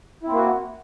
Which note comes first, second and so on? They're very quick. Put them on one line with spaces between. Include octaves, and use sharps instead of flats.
E4 C4 A#3 F#4